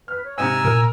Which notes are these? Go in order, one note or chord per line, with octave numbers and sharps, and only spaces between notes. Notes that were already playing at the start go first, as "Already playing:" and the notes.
B4 F6
C#5
G#2 C3 G#5 A#5 E6
A#2 A#4